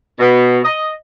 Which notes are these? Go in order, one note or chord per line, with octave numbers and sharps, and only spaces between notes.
B2
D#5